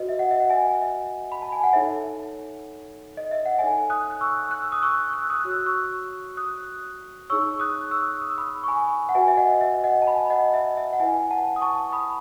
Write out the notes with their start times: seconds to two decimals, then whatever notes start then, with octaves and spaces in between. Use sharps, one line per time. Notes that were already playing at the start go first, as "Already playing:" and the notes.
Already playing: F#4 B4 D#5
0.09 E5
0.19 D#5 F#5
0.31 E5
0.40 F#5
0.50 E5 G#5
0.82 E5
1.32 B5
1.42 A5
1.52 G#5
1.64 F#5
1.73 D#4 A4 C#5 E5
3.17 D#5
3.31 E5
3.46 F#5
3.59 D#4 A4 C#5 E5 G#5
3.90 D#6 F#6
4.11 F#6
4.21 C#6 E6
4.51 F#6
4.62 E6
4.72 D#6 F#6
4.82 C#6 E6
5.13 F#6
5.22 E6
5.30 D#6 F#6
5.44 F#4 C#5 F#6
5.51 E6
5.58 D#6
5.66 C#6 E6
6.37 D#6 F#6
7.30 D#4 G#4 C#5 C#6 E6
7.60 D#6 F#6
7.91 C#6 E6
8.22 D#6
8.29 E6
8.38 B5 D#6
8.63 C#6
8.68 G#5 B5
9.09 F#5
9.15 F#4 B4 E5 G#5
9.28 E5
9.37 D#5 F#5
9.61 E5
9.84 D#5 F#5
10.02 A5
10.07 G#5 B5
10.30 D#5 F#5
10.54 E5
10.77 E5
10.93 F#5
11.00 E4 B4 E5 G#5
11.31 F#5 A5
11.56 D#6
11.61 A5 C#6
11.92 B5 D#6